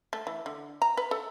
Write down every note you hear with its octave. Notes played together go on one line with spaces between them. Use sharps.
A3
E3
D3
A#5
B4
A4